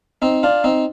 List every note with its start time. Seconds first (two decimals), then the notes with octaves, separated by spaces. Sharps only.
0.22 C4 D#4
0.43 D4 F4
0.64 C4 D#4